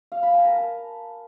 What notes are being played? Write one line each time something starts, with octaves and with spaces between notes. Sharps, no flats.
F5
B5
G#5
A#4
A5